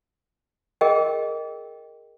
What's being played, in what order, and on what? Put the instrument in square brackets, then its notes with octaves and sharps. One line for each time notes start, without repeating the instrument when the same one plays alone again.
[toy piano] G#4 A#4 D#5 G5